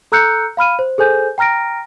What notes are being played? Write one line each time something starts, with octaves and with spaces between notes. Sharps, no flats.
A4 A#5 E6 F#6 G6 C#7
F5 B5 F6 D#7
C5
G#4 A4 C5 G#5 G6
G5 A#5 F6 A#6 D7